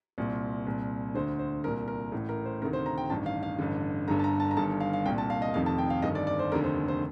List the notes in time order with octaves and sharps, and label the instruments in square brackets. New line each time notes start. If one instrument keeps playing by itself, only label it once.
[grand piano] C2 A#2
C2 A#2
D2 D3 C5
C5
C2 A#2 A#4
A#4
A1 A2
A#4
C5
D2 C3 D#3 A#4
C5
A#5
G5
A1 G2 D#3 A5
F5
F5
A1 G2 D3
G1 G2 D3 A#5
A5
A#5
A5
A#5
G1 G2 D#3 A5
F5
F5
C2 G5
A#2
A5
F5
D#5
F1 F2 D#3 F5
A5
G5
F5
G1 G2 D#3 D#5
D5
D5
C5
F1 D#2 D3 A#4
C5
C5